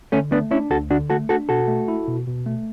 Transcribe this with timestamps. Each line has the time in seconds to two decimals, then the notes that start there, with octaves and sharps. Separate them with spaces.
0.12 D3 A3 C#4
0.32 A3 B3 D4
0.51 C#4 D4 E4
0.70 D2 F#4 A4
0.91 D3 D4 F#4
1.10 A3 F#4 A4
1.29 D4 F#4 A4
1.49 B2 F#4 A4
1.68 A3
1.88 E4
2.08 B2
2.27 B2
2.46 A3